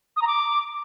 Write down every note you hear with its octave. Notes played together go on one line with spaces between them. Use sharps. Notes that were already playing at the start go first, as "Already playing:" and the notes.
D#6
A#5
D6